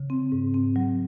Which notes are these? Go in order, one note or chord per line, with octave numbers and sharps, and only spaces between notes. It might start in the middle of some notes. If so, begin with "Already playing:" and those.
Already playing: C#3
C4
G#2
C4
F#3